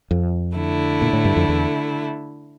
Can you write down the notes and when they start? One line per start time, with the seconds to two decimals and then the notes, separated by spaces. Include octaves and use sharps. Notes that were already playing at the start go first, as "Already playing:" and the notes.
0.11 F2
0.57 D3 A3 E4
1.02 A#2
1.13 A2
1.25 G2
1.37 F2
1.49 E2